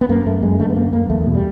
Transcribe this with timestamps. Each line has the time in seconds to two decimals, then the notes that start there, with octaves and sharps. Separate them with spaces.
0.01 B3
0.09 F#2 A#3
0.26 F#2 A3
0.42 F#2 G#3
0.59 D3 A3
0.70 B3
0.76 F#2 A#3
0.92 F#2 A#3
1.10 E2 A3
1.26 B2
1.35 G3